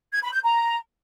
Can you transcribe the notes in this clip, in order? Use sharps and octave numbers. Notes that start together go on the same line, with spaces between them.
G#6
B5
G6
A#5